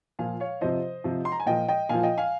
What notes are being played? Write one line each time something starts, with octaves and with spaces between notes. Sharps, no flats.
A#2 F3 F5 G#5
C#5 F5
C3 F3 C5 D#5
C3 F3
C6
A#5
G#5
A#2 F3 D#5 G5
D#5 G5
A#2 F3 F5 G#5
D#5 G5
F5 G#5